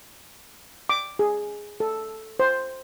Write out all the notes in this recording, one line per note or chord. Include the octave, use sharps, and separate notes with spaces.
D6
G#4
A4
C5